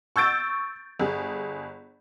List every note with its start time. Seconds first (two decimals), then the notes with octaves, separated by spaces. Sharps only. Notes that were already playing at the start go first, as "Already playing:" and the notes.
0.16 C#6 E6 G6 A6 D7
1.00 G1 G#4